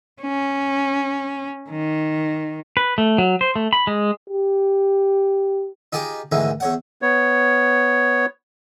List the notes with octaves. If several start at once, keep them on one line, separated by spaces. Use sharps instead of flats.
C#4
D#3
B4
A3
F#3
C5
A3
B5
G#3
G4
D#4 F4 G4 G#4
D2 G#2 D#3 E3
E2 C#5 F#5
B3 C#5